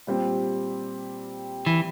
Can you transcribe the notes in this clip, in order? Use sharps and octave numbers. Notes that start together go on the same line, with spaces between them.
A#2 G3 C4
E3